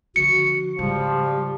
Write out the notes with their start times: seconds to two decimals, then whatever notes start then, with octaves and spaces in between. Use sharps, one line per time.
0.16 D3 F3 F#4 C#7
0.79 G#2 C#3 F3 G3